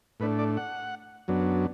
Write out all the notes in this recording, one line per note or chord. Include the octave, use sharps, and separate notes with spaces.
A2 A3 D4 B4
D5
F#5
F#2 F#3 B3 D4